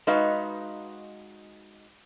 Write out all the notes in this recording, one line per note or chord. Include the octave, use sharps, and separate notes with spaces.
G#3 D#4 F#4 B4 F5